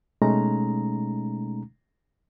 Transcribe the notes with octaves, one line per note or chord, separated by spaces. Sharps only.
B2 G#3 A3 C#4 D#4 A#5